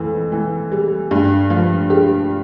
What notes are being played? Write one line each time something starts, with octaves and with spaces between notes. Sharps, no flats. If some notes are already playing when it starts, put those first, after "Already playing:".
Already playing: F2 E3
E3
G3
G2
F3
G4